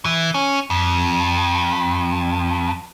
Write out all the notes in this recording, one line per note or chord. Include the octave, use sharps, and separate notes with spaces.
E3
C#4
F2